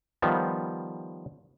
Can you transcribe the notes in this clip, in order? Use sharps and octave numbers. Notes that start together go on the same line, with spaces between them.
D#3 F3 G3 B3